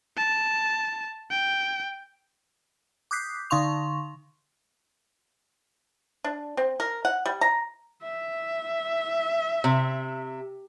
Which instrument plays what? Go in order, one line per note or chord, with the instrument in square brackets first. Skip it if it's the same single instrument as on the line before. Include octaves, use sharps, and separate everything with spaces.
[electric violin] A5
G5
[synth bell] D6 D#6 F#6 G6 B6 C7
D3 D#4 F5 C6 C#6 F7
[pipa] D4
C4
A#4
F#5
G3
A#5
[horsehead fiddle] E5
[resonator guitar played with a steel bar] C3